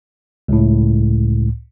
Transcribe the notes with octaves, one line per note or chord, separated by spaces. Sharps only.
C#2 A2